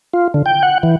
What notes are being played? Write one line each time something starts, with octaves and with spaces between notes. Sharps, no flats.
F4
D3
G5
F#5
E3